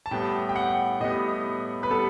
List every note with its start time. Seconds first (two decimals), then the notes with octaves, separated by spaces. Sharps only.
0.06 A5
0.11 A2 G3 B3 G5
0.49 G5
0.56 F#5
1.01 A2 G3 B3 D#5
1.83 B4
1.90 G3 B3 A4